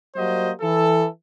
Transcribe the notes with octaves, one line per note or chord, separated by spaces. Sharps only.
F#3 G3 A#3 F#4 C5 D#5
E3 A4